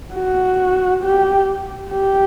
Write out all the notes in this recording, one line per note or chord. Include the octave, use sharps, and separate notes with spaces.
F#4
G4
G4